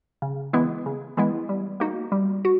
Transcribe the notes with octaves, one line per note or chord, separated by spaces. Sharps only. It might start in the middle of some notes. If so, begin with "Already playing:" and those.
C#3
E3 G#3 B3 E4
C#3
E3 G#3 B3 E4
G3
A#3 D#4 F#4
G3
F#4